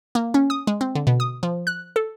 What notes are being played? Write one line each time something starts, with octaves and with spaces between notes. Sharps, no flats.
A#3
C#4
D#6
G#3
C4
D3
B2
D#6
F3
F#6
A4